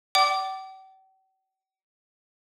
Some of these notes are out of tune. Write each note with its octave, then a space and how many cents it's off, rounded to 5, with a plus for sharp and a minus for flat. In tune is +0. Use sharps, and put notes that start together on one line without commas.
D5 +0 G5 -45 D6 +0